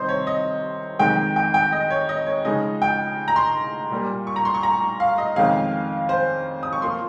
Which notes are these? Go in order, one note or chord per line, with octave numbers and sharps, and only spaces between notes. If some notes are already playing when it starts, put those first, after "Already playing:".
Already playing: C3 D#3 G3 C4 C5 D#5 C6
C#5
D#5
F2 D#3 G#3 G5
G5
G5
D#5
C#5
D#5
C#5
C#3 F3 G#3 D#4 D#5
G5
A#5
C6
A#2 G3 A#3
C#6
A#5
C6
C#6
A#5
F5
D#5
F2 D#3 G#3 C#4 F5
C5
D#6
C#6
F3 A#3 F4 C6